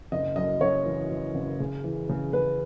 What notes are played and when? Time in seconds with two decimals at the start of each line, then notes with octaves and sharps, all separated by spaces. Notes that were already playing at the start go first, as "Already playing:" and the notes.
0.12 F#1 D#5
0.36 F#2 D#5
0.61 F#1 C#5
0.86 E3
1.10 E3
1.35 F#1
1.60 C#3
1.84 E3
2.09 C#3
2.33 C#3 B4